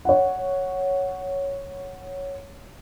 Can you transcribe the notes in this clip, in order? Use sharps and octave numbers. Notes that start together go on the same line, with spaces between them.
C#5 F#5